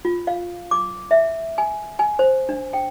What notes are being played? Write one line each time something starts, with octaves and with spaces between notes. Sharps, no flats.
F4
F5
D6
E5
G#5
G#5
C5
D4
G5